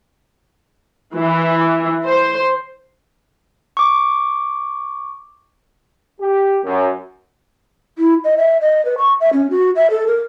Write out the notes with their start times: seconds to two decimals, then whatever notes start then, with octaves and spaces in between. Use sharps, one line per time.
1.15 E3
2.07 C5
3.77 C#6 D6
6.21 G4
6.64 F#2
7.98 E4
8.24 D#5
8.37 E5
8.61 D#5
8.85 B4
8.98 C#6
9.20 E5
9.33 C#4
9.51 F#4
9.76 E5
9.90 A4
10.07 A#4